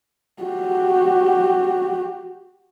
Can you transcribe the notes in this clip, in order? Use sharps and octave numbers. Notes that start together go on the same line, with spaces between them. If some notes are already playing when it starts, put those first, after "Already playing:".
F#4 G4